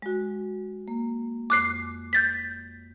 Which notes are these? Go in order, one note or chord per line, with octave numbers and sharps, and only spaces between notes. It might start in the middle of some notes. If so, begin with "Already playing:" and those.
G#3 F#4
A#3
F2 D6 F#6 C7
G6 A6 B6